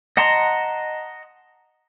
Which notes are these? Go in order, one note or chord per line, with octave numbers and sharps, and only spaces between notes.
D#5 F#5 A5 A#5 C6